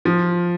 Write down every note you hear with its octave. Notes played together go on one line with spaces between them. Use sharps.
F3